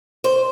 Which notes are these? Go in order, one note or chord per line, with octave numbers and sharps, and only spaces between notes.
C5